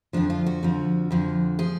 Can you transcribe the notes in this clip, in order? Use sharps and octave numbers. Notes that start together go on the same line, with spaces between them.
F2 D3 F3 D4
F4
F#4
F2 D3 F3
F2 D3 F3
F3 G#4